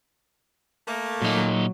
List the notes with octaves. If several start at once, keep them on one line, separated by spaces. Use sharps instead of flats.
A3 A#3
A#2 F#3 D#4